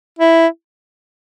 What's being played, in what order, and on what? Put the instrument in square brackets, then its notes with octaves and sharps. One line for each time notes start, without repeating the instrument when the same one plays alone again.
[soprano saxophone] E4